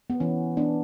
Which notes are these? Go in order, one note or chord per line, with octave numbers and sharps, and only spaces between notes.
B3
E3 C#4
B3 D4